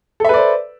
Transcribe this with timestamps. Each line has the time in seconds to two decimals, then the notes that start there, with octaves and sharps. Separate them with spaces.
0.20 A4
0.25 E5
0.29 B4
0.34 D5
0.38 C5